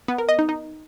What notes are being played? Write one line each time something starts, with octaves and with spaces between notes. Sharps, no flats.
B3
A#4
D#5
D#4
D#4